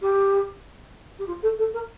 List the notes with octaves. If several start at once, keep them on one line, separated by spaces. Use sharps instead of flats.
G4
G4
F4
A4
A4
A#4